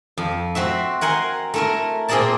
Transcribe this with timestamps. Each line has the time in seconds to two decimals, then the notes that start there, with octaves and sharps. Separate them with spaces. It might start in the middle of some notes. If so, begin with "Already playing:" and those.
0.17 F2
0.55 C4 F#4 E5
1.01 A#4 F#5 G#5 C6
1.54 A3 E4 A#4
2.08 A#2 C4 G#4 A#4 D5 A5